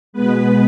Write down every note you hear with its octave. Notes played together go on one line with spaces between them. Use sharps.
B2 G#3 B3 B4